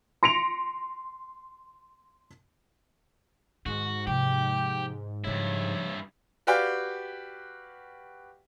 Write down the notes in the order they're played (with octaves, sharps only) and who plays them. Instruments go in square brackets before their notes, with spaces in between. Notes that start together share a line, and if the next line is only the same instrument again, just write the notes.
[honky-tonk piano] C6 A#6 C#7 D7 F7
[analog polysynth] G#2 [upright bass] D#3 [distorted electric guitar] F#4
[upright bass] C3 F3 [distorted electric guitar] G4 [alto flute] G5
[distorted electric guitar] G2 E4 [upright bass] C#3 F3 [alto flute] C#5
[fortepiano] F#4 G4 B4 D5 F5 G5